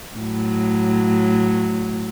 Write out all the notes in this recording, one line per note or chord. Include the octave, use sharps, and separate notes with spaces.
A2 F#3